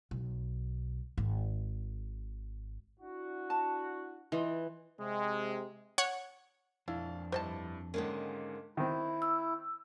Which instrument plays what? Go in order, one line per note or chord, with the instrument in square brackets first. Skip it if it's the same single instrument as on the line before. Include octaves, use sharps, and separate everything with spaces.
[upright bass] B1
G#1
[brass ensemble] D4 E4 F#4
[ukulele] A5
[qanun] E3 [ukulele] F4 D#5
[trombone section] C3 G#3
[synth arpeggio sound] C#5 F#5
[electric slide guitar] F2 D4 [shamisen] E4 [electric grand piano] F5
[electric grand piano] G2 E4 [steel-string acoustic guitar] D3 [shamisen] C5 D#5 A5
[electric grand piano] G#2 D3 C#4 [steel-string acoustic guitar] D#3 G#3 A#3
[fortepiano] D#3 C4 [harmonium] E4
[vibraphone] E6